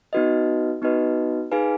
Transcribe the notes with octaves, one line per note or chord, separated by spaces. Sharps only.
B3 D#4 F#4 B4 D#5
B3 D#4 F#4 B4 D#5
D#4 G#4 B4 F5 G#5